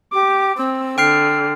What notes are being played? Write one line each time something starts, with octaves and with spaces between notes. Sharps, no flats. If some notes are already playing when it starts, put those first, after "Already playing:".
G4 D6
C4 E6
D3 G5 F6 C7